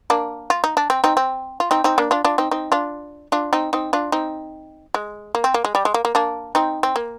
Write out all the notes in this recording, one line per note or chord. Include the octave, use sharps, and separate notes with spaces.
A#3 D4
F4
D#4
D4
C4
C4 D#4
C4
F4
C4 D#4
C4 D#4
A#3 D4
D4 F4
D4 F4
C4 D#4
C4 D#4
D4 F4
D4 F4
C4 D#4
C4 D#4
D4 F4
C4 D#4
G#3
A#3
C4
A#3
G#3
G3
G#3
A#3
A#3
A#3 D4
C4 D#4
C4
A#3